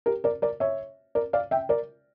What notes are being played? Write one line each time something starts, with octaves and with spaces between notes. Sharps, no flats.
G4 A#4
A#4 D5
A#4 D5
C#5 E5
A#4 D5
D5 F5
E5 G5
A#4 D5